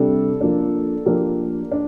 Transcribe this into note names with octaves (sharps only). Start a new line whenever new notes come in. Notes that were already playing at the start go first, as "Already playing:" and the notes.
Already playing: C3 G3 D4 A4
F3 A#3 D4
F3 A#3 D4 G4 A#4
D4